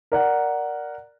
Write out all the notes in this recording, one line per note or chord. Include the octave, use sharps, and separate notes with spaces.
A#4 D5 F#5